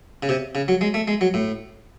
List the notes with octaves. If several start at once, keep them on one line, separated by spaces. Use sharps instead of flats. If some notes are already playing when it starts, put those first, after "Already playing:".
C#3
C3
C#3
F#3
G#3
A3
G#3
F#3
A2